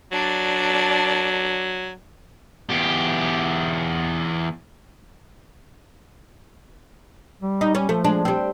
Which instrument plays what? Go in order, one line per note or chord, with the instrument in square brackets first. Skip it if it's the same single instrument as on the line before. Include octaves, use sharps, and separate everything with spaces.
[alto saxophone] F#3 [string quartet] D4 D5
[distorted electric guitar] E2 G4
[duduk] G3
[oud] D#4
C#4
[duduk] F3 [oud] A3
[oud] G#3 D4
G3 C4